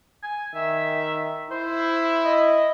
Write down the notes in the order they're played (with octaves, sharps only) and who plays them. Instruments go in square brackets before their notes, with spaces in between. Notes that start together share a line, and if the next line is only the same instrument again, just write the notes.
[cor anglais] G#5
[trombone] D#3 [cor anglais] E5
[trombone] E4 [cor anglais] C5
[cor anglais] D#5